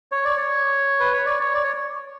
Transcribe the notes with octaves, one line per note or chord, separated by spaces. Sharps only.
C#5
D5
C#5
B4
C#5
D5
C#5
D5
C#5